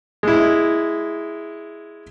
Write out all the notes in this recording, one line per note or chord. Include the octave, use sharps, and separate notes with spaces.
G#3 E4